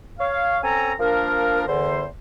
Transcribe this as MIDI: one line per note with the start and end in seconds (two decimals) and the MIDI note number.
0.19 0.58 73
0.19 0.58 77
0.63 0.92 60
0.63 0.92 61
0.63 0.92 69
0.63 0.92 80
0.63 0.92 82
0.99 1.64 53
0.99 1.64 58
0.99 1.64 62
0.99 1.64 70
1.68 2.05 40
1.68 2.05 50
1.68 2.05 72